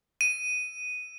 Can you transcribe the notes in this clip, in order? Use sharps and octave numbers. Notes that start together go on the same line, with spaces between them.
D#7